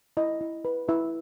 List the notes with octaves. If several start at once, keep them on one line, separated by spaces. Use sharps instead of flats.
E4 D#5
E4
B4
E4 B4 E5